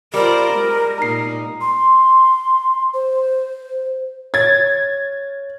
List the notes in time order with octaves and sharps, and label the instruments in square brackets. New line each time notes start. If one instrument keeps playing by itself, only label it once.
[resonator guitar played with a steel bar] G3 [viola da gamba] F4 C5 D5 [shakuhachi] A#4
[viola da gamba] G#3
[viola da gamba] A#2 D#4 [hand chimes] A#5 C7
[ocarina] C6
C5
[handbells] C#5 [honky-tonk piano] G#6 A6